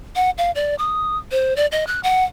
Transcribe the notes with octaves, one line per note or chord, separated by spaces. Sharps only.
F#5
F5
D5
D#6
C5
D5
D#5
F#6
F#5